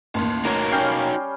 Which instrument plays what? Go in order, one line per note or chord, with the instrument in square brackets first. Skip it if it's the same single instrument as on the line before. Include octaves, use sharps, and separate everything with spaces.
[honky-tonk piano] A1 D#2 [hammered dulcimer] A5 C6
[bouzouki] A#3 [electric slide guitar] D#4 F#4 C#5
[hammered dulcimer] G3 C#4 [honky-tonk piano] F6 G6 C7